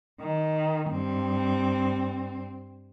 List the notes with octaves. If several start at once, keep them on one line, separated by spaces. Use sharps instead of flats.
D#3
G2 C4